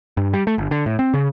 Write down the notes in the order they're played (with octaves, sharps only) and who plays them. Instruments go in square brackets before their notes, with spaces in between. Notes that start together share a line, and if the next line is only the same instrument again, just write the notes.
[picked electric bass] G2
G3
A3
G1
D3
A2
C4
C#3